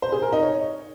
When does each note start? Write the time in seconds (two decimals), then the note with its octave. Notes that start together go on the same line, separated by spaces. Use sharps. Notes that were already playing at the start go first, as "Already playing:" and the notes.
0.02 C5
0.12 G#4
0.22 A#4
0.32 D#4
0.43 C#5